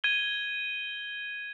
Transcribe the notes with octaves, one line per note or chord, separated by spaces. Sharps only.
G#6 D#7 G7